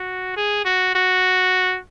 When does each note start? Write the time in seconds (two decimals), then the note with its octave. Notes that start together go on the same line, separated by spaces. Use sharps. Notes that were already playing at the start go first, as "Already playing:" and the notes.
Already playing: F#4
0.36 G#4
0.65 F#4
0.95 F#4